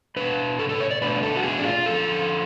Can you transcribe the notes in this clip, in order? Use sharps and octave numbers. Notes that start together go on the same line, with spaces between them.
B2 G#3 D4 B4
A4
A4
C#5
D5
B2 A3 D4 B4
A4
F#4
G#4
D4
F4
F#2 D3 F3 A4